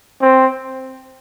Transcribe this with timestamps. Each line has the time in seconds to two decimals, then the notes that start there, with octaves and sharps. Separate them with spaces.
0.21 C4